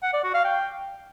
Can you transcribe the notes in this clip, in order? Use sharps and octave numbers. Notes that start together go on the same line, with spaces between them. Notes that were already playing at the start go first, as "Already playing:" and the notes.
F#5
D5
F#4
F5
G5